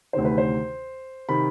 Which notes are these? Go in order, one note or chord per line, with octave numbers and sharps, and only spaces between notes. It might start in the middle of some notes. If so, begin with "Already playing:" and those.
D2 C3 D#3 C5
B4
C5
C3 D#3 B5